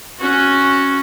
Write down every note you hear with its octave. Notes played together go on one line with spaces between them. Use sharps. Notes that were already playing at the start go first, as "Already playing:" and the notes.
C#4 F#4